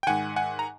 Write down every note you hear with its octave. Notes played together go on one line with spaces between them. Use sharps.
G5
G#2 D#3 F#5 G#5
F#5 G#5
A#5